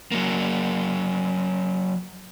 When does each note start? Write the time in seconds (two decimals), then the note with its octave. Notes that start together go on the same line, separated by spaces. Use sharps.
0.12 F#3 A#3